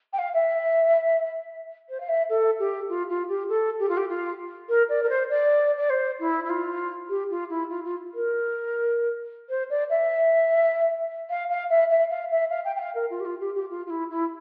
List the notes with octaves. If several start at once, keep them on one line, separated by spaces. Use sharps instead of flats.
G5
F5
E5
C5
F5
E5
A4
G4
F4
F4
G4
A4
G4
F4
G4
F4
A#4
D5
A#4
C5
D5
D5
C5
E4
E4
F4
G4
F4
E4
F4
F4
A#4
C5
D5
E5
F5
F5
E5
E5
F5
E5
F5
G5
G5
F5
A#4
F4
G4
F4
G4
G4
F4
F4
E4
E4